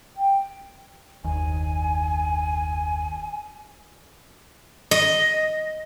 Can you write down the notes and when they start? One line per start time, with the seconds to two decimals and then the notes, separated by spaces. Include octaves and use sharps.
0.16 G5
1.24 F#1 D#2 G#5
4.91 D#5